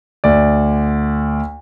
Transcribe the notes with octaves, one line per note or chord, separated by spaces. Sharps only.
D2 D5